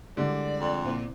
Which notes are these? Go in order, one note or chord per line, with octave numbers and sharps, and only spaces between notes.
D3 G3 G#3 E4 D5
F2
A#2 C4 E4